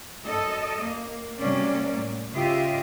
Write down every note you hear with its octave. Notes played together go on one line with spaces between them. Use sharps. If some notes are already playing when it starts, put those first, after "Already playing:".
F#2 A4 D#5
A#3
C3 F#3 G3 A#3 C#4 D5
A2
C#3 F4 G4 D#5 E5